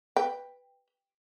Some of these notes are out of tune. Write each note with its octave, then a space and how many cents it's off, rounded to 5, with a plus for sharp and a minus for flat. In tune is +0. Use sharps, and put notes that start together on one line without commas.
B4 +5 G5 +15